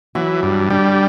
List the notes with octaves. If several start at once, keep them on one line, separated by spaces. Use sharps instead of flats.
E3 F#3 F#4
G2
D3 G3 D4